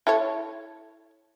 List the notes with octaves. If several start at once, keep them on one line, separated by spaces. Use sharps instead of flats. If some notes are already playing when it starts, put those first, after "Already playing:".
E4 A4 C#5